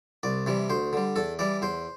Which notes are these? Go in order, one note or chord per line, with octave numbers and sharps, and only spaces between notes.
C2 D5
C3 E3 G3
D2 C5
D3 G3
E2 A4
E3 G3 D5
E2 C5